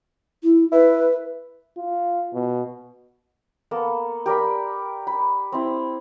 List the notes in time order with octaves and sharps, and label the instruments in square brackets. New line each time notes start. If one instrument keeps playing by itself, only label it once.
[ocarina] E4
[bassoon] E4 [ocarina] B4
[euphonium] F4
B2
[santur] A#3 B3 A4
G4 A#4 D5 B5
B5
C4 E4